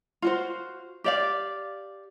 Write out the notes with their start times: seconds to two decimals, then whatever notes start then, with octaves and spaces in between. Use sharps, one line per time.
0.22 F4 F#4 C5
1.04 G4 D5 F5